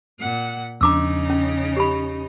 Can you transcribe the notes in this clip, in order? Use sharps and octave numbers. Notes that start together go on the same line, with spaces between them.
A#2 F#5
E2 C#3 F3 D4 D#4 A#5 D6 E6
C#4
G4 B5